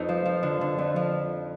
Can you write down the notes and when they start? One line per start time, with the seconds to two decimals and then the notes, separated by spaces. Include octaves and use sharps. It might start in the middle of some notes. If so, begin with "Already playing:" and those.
Already playing: F2 D#4 B4
0.09 F3
0.25 F3
0.43 D3
0.61 D3
0.78 F2
0.96 F3